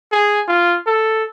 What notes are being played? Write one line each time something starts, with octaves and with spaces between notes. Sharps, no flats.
G#4
F4
A4